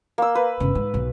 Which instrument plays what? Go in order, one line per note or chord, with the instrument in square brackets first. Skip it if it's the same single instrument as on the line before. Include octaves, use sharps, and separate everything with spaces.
[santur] A#3 E6
B4
[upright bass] G1 C#3
G#2
B1